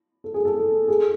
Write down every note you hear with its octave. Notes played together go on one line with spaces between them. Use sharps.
A4
G#4
A4
G#4